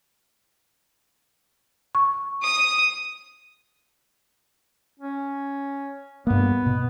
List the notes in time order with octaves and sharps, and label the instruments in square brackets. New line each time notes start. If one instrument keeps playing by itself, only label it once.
[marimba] C#6
[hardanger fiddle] D#6
[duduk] C#4
[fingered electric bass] G2 A#3 [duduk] B3
[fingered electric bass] B2